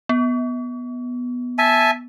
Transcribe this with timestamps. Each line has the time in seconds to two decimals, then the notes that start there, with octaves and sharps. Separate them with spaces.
0.09 B3
1.58 E5 G#5 A5